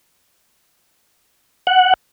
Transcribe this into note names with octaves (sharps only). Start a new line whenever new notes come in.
F#5